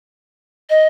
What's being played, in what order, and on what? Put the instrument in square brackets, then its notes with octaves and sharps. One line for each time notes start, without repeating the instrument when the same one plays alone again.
[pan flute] D#5